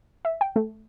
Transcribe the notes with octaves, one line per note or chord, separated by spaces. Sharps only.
E5
G5
A3